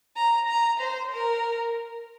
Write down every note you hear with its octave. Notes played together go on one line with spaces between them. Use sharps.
A#5
A#5
C5
A#4